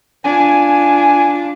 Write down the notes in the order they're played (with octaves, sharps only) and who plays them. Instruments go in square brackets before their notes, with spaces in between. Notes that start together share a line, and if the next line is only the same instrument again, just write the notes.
[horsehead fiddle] D4 F4 [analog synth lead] G#5